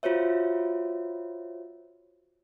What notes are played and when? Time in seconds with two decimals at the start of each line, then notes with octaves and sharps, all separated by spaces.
0.03 F4 F#4 C5 C#5 E5